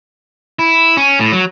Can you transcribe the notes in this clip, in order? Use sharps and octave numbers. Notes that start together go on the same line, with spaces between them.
E4
C#4
A2
F#3